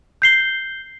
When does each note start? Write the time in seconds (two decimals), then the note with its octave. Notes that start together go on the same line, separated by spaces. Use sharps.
0.22 G6 C7 G7